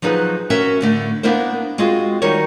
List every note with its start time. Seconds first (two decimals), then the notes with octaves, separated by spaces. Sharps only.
0.02 F3 F#3 D#4 G#4 B4
0.50 C#4 F#4 A#4 E5
0.81 A2 D3 A3
1.23 A#3 B3 D4 E4 A#4 C5
1.78 G#3 C4 F4 F#4 G#4
2.22 D#3 G3 D#4 F#4 A#4 C#5